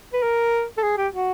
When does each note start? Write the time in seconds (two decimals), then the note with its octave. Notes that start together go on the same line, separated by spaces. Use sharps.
0.13 B4
0.22 A#4
0.77 A4
0.83 G#4
0.97 G4
1.13 F#4